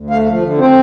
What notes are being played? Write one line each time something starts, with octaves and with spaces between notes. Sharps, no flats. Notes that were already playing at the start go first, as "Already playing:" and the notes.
Already playing: D2
A3 F5
F3
D3
C4 C5